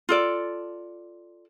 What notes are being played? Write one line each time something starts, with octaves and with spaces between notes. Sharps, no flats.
F4 A4 D5